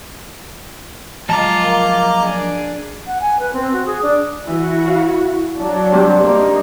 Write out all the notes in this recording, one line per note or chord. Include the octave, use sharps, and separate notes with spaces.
F3 F#3 G#3 F4 D#5 A5 A#5 D6
A#3
D4 G#4
F#5
G#5
B4
C4
F#4
G#4
D4
E3 E4 F#4
F5
F#3 D4
G2 C3 G3
A#3 D4 D#4